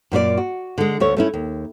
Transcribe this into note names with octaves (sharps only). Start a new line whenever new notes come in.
F#2 A#2 F4 D5
F#4
D3 G#3
D2 A3 C#5
A3 C#4 E4
D#2